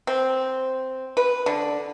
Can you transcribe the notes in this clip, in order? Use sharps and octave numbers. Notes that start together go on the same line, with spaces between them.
C4
B4
D3